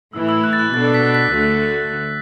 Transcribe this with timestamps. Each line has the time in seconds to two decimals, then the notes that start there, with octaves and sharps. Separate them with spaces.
0.13 A2 E3 A3 E4 E6
0.29 E6
0.44 F#6
0.53 A6
0.59 F#6
0.74 B2 B3 D4 A4 A6
0.94 B6
1.15 B6
1.34 D2 D3 A3 F#4 B6